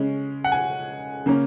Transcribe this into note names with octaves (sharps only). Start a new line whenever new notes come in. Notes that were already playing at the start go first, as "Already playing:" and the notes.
Already playing: C#3 G#3 C#4
F#5
G#5
C#3 A#3 C#4